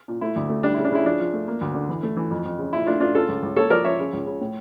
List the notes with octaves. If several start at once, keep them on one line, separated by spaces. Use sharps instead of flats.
A#2
A3 E4
D2
A3
G3 D4
E4
C#3
D4
C#3 E4
F3 D4
F3
A3
A#3
D2
D3
E3
A3
E3
F2
F2
C#3
A#2 E4
A3 D4 F4
A3 D4 F4
C#3 F4 A4
C#2
C#2
A#3 A4 C#5
F3 A#4 D5
F3 C#5 E5
C#3
C#2
C#3
A2